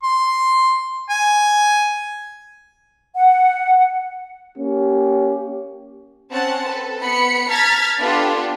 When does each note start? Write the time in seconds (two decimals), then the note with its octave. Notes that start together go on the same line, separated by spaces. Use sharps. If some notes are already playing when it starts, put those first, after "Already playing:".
0.03 C6
1.10 G#5
3.16 F#5
4.58 A#3 C#4 G4
6.31 C4 C#4 F#5 A5
6.68 A4 B4
7.02 B3 B5 C#7
7.50 A5 A#5 F6 G#6 A6 B6
8.00 B3 D4 F4 G4 A4